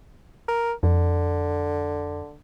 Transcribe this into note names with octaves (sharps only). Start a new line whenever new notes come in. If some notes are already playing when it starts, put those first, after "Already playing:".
A#4
F2 D3